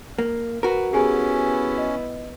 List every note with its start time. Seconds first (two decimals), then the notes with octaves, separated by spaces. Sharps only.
0.18 A#3
0.63 F#4 A#4 B4
0.93 B3 C#4 E4 G4 G#4 G#5
1.78 D#5